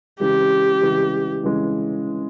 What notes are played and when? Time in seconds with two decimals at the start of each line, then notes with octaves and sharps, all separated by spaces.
0.20 C#3 E3 G#3 G4
0.81 C#3 E3 G#3
1.43 C#3 E3 G#3